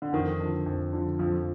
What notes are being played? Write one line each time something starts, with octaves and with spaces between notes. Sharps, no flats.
D3
F2 D#3
D3 F3
F2
D3 F3
F2 F3